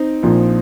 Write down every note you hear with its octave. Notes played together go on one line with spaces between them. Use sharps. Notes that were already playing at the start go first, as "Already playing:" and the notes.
Already playing: C4 D#4
A#1 A#2 F3